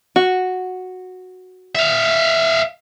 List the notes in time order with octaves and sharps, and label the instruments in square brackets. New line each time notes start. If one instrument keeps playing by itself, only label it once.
[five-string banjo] F#4
[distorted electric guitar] E5 F5